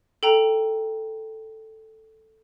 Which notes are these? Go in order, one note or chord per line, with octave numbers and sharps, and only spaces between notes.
A4 G5 A#5